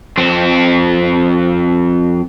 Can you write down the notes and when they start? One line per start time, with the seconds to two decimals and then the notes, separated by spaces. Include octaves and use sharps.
0.18 F2 C4